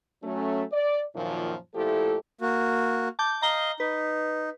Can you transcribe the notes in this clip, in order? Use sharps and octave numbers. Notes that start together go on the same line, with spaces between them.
F#3 A3 C#4
D5
F#2 A#2 D#3 F3
A#2 F3 A3 E4 G4 A4
A#3 F#4
A5 D6 G6
D#5 F5 A#5 G7
D#4 B4